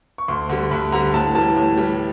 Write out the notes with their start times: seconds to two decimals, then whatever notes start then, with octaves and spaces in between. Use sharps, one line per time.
0.18 C#6
0.28 D2 C6
0.50 D3 G3
0.71 D2 B5
0.92 D3 G3 A#5
1.14 A2 A5
1.35 E3 G3 A5
1.57 A2
1.78 E3 G3